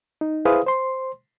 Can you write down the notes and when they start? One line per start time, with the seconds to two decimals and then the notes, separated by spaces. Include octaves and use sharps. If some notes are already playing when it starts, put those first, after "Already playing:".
0.21 D#4
0.45 E4 G#4 B4 C5 F5 D#6
0.66 C5 C6